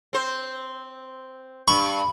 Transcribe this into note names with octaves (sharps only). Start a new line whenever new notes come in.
C4 C5
G2 B5 C#6